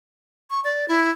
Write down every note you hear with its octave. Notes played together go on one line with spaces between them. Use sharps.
C#6
D5
E4